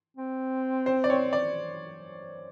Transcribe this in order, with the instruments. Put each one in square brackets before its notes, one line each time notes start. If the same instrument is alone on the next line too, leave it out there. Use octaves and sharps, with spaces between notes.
[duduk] C4
[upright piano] C5
D5
C#5
D5